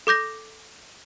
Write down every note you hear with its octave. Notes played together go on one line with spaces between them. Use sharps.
A4 D6 G6 A#6